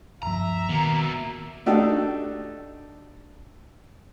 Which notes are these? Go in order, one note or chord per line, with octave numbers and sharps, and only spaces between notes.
D1 G2 F3 E5 A#5
B2 D#3 A#3
A3 D4 D#4 F#4 G4 A4